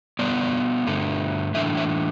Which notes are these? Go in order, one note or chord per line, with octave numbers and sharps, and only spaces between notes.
B2 G3 B3 D5
G2 D3 A3
A2 E3 A3 D4 E5
E5